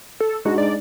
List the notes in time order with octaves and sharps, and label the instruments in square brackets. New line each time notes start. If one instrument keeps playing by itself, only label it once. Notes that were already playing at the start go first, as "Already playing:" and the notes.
[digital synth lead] A4
[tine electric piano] G#3 D4 D#4 [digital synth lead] F#4
[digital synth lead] D5